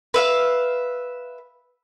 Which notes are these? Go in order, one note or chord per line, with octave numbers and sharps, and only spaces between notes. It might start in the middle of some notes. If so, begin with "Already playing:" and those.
B4 E5 F5